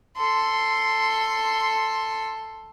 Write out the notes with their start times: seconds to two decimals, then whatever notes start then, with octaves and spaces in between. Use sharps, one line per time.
0.17 A4 C6